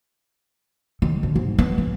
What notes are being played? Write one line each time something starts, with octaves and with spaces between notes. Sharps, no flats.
D#3
D3
G#2
B3
E3